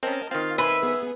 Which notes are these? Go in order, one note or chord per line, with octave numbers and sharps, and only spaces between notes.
C4 C#4 A#4 D#5 A5
D#3 C4 F4 F5
B4 E5 G#5 C6 E6
B3 G#4